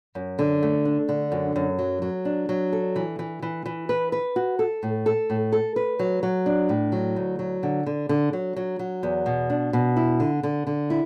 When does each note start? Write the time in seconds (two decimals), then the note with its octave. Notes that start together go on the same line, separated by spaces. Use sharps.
0.15 F#2
0.39 D3
0.63 A3
0.85 D4
1.09 D3
1.32 F#2
1.56 F#2
1.79 F#3
2.02 F#3
2.25 D4
2.49 F#3
2.73 A4
2.96 E3
3.19 E3
3.43 E3
3.66 E3
3.89 B4
4.12 B4
4.36 F#4
4.59 A4
4.83 A2
5.06 A4
5.30 A2
5.52 A4
5.76 B4
6.00 F#3
6.23 F#3
6.46 D4
6.69 A2
6.92 F#3
7.16 D2
7.39 F#3
7.63 D3
7.86 D3
8.09 D3
8.33 F#3
8.56 F#3
8.79 F#3
9.03 E2
9.26 B2
9.50 D4
9.73 B2
9.96 E4
10.20 D3
10.43 D3
10.67 D3
10.90 E4